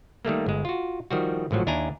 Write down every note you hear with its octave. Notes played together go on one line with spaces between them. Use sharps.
D#3 G3 A3 A#3
G1 G#3
F4 F#4
D#3 F3 G3 F#4
G#1 A2 F3 F#3
D#2 D4 E4 G#5 A#5